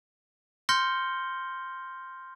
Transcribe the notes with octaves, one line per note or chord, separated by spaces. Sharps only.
C6 F6 G6 A#6 C#7 G7